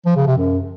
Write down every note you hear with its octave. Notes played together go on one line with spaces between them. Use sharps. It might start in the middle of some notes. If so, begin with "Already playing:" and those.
F3
C#3
C3
F#2